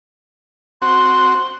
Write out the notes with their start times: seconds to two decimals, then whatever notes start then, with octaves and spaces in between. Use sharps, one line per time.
0.82 C4 F#4 C6